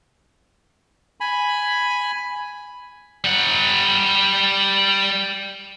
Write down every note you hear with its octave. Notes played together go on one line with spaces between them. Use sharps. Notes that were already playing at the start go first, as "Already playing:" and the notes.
G#5 B5
G3 F#5